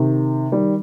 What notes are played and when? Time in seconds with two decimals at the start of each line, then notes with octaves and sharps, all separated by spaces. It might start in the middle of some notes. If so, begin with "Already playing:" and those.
Already playing: C3 D#3
0.52 D#3 G3